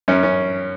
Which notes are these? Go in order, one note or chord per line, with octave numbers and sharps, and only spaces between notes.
F#2 C#4
C#4